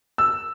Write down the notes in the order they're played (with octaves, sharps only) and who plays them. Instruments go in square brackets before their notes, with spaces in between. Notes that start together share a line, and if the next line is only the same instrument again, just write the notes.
[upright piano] E6